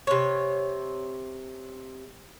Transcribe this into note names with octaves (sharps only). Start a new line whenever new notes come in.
C3 C#5